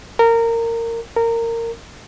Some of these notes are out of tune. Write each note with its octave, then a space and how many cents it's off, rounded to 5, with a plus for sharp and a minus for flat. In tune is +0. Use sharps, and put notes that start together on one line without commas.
A#4 -20
A#4 -20